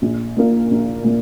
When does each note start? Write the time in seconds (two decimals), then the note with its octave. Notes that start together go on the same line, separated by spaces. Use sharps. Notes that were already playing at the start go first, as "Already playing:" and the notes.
0.02 A#1
0.37 A#2 A#3
0.71 A#1
1.04 A#2